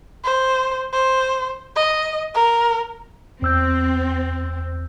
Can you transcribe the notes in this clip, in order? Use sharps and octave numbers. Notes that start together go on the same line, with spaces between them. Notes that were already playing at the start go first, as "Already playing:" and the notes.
C5
C5
D#5
A#4
E2 C4 E6 G6